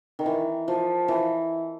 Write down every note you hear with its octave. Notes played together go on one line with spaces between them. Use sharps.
D#3
E3
F3
E3